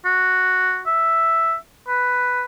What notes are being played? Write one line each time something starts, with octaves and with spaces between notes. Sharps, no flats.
F#4
E5
B4